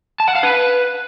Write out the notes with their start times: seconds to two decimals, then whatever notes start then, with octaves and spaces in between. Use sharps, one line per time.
0.20 A5
0.28 F#5
0.35 F5
0.43 B4